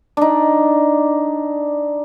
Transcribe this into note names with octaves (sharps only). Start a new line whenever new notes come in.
D4 D#4